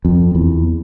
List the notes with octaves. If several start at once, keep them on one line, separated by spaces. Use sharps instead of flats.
F2
E2